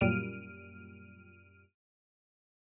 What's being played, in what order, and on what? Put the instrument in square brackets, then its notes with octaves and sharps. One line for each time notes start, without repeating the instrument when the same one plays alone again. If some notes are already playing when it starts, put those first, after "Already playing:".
[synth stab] F#2 A#2 G3 F6 D7 D#7